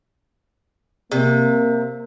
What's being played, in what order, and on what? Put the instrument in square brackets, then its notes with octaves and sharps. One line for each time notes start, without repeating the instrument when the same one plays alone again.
[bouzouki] C3 [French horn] A#3